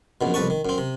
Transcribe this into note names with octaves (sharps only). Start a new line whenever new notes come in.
A#1 F#2 B2
C2 F2 B4 A5 C#6
D#3
F#2 C4
C3